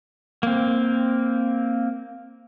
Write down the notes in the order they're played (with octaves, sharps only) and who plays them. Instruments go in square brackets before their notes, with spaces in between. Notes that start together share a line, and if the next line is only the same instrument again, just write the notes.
[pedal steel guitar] A#3 C4